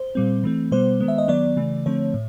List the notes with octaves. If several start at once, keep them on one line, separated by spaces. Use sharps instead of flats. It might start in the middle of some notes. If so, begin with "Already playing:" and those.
Already playing: C5
A#2 G3 C4
E3 A3 C4
B2 G3 B3 C5
D#3 G#3 B3
E5
D#5
D#3 F#3 B3 D5
C#3 E3 A3
D3 F3 A3 C4 C#5
A2